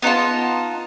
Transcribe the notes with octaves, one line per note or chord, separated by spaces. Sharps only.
B3 D#4 F4 A5